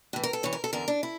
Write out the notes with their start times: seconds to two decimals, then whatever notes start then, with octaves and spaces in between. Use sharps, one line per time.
0.13 A2 E3
0.23 A#4
0.33 A4
0.43 G2 E3 C#5
0.53 A#4
0.64 A4
0.73 E2 D3 A#4
0.88 D4
1.03 E4